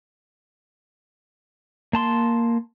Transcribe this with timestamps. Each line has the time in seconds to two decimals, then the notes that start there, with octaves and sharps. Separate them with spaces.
1.93 A#3 A5 C6